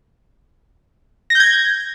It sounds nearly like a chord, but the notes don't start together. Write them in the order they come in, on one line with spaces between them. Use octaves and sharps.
A#6 G6 G#6